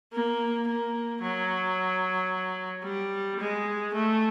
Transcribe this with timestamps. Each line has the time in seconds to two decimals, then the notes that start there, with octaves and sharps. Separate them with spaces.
0.13 A#3
0.68 A#3
1.22 F#3
2.84 G3
3.39 G#3
3.94 A3